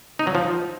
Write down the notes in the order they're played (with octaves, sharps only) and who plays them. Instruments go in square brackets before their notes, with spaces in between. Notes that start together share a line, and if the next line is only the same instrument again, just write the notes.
[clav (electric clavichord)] D#4
F#3
F3